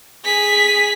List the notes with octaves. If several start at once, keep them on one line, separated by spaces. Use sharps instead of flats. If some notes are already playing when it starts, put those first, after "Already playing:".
G#4 B6